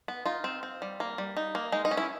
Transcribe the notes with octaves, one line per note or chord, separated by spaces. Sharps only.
B3
D#4 F4
C4
C4
G3
A#3
G3
D#4
A#3
G#3 D#4
D#4
C#4
E4